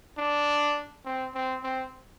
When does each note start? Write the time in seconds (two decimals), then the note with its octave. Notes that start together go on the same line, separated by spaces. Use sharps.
0.18 D4
1.06 C4
1.34 C4
1.64 C4